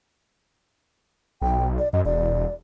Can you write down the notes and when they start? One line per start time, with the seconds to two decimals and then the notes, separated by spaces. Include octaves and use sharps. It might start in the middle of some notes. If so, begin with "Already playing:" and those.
1.42 B1 G5
1.78 D5
1.93 F#2 D#5
2.05 E1 D5